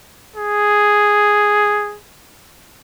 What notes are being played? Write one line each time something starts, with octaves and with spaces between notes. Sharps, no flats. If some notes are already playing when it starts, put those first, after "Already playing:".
G#4